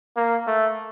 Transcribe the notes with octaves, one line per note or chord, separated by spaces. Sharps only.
A#3
A3